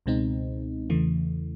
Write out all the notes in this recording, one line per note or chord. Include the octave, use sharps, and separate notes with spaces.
C#2 B2 G#3 C4 D#4
E2 C#3 E3 A3